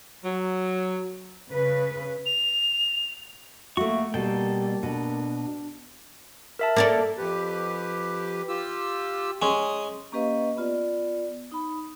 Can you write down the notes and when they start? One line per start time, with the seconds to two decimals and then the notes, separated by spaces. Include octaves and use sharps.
0.23 F#3
1.51 C#3 B4
2.26 F7
3.77 A3 A#3 F#4 E5 C#6
4.14 B2 G3 A#3 A4 G5
4.83 B2 D4
6.59 A#4 E5 A5
6.76 A#3 A4 D5
7.18 F2 G4 B4
8.49 F4 G4 E6
9.42 G#3 C#4 D#6
10.12 A#3 C#4 G4 B4 D#5 F5
10.57 B3 F4 D5
11.52 D#4 B5